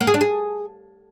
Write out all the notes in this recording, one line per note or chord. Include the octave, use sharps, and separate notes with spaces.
A#3
G#4
D4
G#4